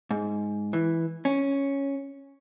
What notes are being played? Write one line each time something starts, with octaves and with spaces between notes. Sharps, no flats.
G#2
E3
C#4